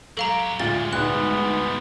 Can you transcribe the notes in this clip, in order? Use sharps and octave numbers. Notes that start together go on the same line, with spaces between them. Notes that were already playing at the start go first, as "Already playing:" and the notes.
F#3 G4 A4 F5 A#5
D2 A2 G3 G#3 F4 A6
D2 G#2 B3 F#6